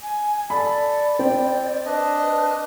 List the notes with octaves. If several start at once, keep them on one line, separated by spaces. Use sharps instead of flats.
G#5
A4 D5 B5
C4 G5
D4 B4 D#5